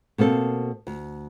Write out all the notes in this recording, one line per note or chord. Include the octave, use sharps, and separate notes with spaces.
B2 A#3 C4 A4
D2